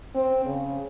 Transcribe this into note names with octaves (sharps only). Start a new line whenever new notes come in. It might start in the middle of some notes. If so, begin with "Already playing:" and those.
C4
C#3